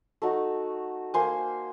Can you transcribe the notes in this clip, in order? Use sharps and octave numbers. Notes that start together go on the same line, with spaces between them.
A3 D#4 F#4
A#3 C5 G#5